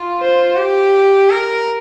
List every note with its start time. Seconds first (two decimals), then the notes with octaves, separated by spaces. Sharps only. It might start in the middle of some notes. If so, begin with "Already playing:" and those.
Already playing: F4
0.20 C5
0.56 G4
1.30 A#4